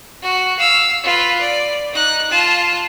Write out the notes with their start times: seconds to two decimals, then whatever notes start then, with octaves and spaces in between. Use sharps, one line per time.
0.22 F#4
0.59 F5 E6
1.03 F4 B4
1.41 D5
1.92 D#4 F#6
2.30 F4 A5